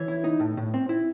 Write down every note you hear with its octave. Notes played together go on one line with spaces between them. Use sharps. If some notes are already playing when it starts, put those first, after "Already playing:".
Already playing: E3 C#5
E4
D#4
A2
A2
C4
E4